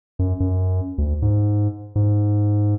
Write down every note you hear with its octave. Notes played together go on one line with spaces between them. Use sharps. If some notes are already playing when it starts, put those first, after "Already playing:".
F#2
F#2
D2
G#2
G#2